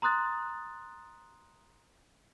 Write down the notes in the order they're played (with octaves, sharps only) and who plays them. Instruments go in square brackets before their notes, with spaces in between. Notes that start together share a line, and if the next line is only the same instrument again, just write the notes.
[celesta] A#5 C6 D#6 F#6 A6